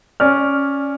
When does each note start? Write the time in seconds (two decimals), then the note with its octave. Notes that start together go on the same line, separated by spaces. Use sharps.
0.20 C#4 D5 F6